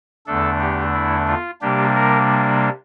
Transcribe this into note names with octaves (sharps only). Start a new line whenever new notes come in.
E2 D3 A3 D4 A4
G4
E4
F4
C3 G3 A#3 D4 G4
A#4